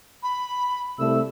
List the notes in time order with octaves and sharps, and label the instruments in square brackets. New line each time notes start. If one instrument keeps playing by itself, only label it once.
[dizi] B5
[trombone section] C2 A3 [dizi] E6